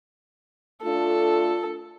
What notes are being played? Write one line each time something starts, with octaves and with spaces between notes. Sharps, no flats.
A3 D4 F4 A4